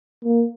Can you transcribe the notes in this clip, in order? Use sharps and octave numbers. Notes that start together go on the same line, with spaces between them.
A#3